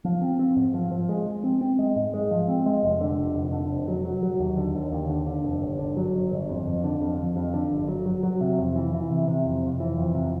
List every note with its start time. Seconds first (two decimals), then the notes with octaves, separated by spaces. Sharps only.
0.04 F3
0.22 C4
0.39 C4
0.56 G#2
0.74 F3
0.91 F3
1.09 G#3
1.26 G#3
1.44 C4
1.61 C4
1.79 G#3
1.96 G#2
2.14 G#3
2.31 F3
2.48 C4
2.66 G#3
2.83 F1
3.01 D3
3.18 F1
3.36 F1
3.53 D3
3.70 F1
3.88 F#3
4.05 F#3
4.23 F#3
4.40 D#2
4.57 D3
4.75 D#2
4.92 D#2
5.10 D3
5.27 D3
5.45 F1
5.62 G1
5.79 D3
5.97 F#3
6.14 G1
6.31 G1
6.49 F2
6.67 F2
6.84 D3
7.01 F2
7.19 F2
7.36 F2
7.54 D3
7.71 G1
7.88 F#3
8.06 F#3
8.23 F#3
8.41 C3
8.58 F2
8.76 E3
8.93 E3
9.10 C3
9.28 C3
9.45 F2
9.63 F2
9.80 E3
9.97 F2
10.15 C3